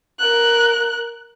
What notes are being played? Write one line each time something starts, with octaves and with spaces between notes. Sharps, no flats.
A#4 F#6